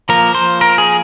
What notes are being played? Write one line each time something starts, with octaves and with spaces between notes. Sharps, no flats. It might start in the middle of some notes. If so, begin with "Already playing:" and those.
F3 A#3 A#4
C5
A#4
G#4